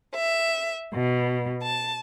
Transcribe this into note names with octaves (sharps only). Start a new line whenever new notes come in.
E5
B2
A5